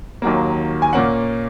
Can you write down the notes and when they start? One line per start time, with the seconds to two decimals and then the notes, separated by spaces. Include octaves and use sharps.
0.22 D#2 D#3 F#3 A#3
0.82 G#5
0.93 A#2 A#3 C#4 F#5